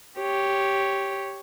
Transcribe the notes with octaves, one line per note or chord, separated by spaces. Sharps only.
G4 C#5